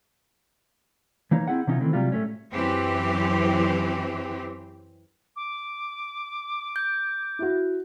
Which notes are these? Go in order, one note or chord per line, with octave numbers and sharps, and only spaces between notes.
E3 A#3 D#4 C#5
C4 E4 G#4 F#5
C3 E3 C#4 D#4 F4
D#3 E3 A3 C4
C3 F#3 G3 F4
A2 A3 C#4
F#2 E3 C4 G4
D6
G6
E4 F#4